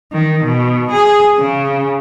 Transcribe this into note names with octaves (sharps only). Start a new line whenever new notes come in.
D#3
B2
G#4
C#3